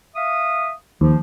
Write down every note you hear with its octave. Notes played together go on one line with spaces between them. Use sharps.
E5 F5 D#6
D#2 F3